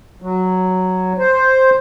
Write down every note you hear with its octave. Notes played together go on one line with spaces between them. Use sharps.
F#3
C5